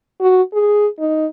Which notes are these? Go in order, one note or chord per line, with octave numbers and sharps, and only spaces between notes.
F#4
G#4
D#4